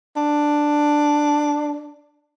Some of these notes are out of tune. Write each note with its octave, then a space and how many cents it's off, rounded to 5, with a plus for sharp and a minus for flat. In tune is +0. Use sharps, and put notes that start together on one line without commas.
D4 +5